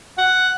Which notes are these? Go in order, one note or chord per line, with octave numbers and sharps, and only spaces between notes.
F#5